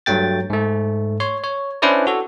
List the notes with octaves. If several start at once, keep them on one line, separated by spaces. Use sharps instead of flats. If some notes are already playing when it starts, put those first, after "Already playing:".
G2 F#3 A3 G5 A6
G#2 A3
C#5 C6
C#5
C#4 D4 E4 B4 C5 D5
F#4 A4